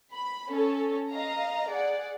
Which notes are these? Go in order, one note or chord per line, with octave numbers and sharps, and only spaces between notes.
B5
C#4 A4
D#5 F5 A#5
G#4 D5 F#5